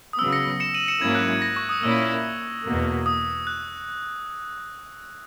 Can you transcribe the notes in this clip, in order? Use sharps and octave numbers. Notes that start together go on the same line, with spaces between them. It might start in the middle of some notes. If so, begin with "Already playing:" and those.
D#6
C#3 F#3 B3 E6
A#6 C#7
C#7 E7
D#7 F#7
C#7 E7
G#2 F#3 A#3 C#4 E4 G#6
F#6
G#6
A#6
C#6
D#6
A#2 A#3 C#4 E4 E6
E2 B2 A#3
D#6
F#6